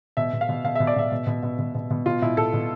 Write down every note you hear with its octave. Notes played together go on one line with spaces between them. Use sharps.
B2 E5
B2
F5
B2
B2 F5
B2 E5
D5
B2 E5
B2
B2
B2
B2
B2
B2
B2 F4
B2 E4
B2 A4
B2